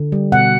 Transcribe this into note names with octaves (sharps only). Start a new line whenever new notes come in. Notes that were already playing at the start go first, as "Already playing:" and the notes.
Already playing: D3
G3
B2 F#5